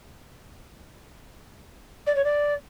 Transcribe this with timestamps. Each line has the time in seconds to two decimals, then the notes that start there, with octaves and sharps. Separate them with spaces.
2.06 D5
2.15 C#5
2.24 D5